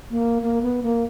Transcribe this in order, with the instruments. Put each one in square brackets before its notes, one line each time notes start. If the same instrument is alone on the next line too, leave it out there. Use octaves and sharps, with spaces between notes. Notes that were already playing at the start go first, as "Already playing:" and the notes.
[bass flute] A#3
A#3
B3
A#3